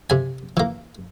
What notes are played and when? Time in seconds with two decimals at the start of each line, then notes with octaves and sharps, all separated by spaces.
0.10 C3 G#5
0.57 E3 A#3